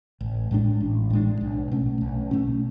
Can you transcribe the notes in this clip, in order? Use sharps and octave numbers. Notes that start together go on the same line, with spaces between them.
A1
A2 G#3 D4
A1
A2 G#3 D4
B1
B2 A3 C#4
B1
B2 A3 C#4